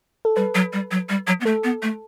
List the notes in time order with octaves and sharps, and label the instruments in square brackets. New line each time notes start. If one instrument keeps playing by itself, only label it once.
[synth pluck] A4
[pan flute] G3 [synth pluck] B4
[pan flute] F#3
G3
F#3
G3
F#3
B3
[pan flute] A3 [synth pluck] A4
[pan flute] B3
A3